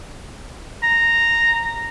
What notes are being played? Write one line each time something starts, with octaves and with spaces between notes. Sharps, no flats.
A#5